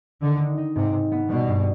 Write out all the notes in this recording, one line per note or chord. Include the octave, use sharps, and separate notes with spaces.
D3 D#3
D#4
D#4
G#2 C3
G#2
B3
B2 G3
G2